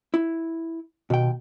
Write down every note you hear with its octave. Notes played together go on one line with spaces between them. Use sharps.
E4
D#2 B2 G5